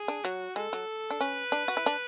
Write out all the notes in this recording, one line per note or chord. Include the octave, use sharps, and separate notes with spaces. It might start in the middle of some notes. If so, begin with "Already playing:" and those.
Already playing: G#4
D4
F#3 F#4
G#3 A4
F#3
D4
C#4 B4
D4
F#4
E4
D4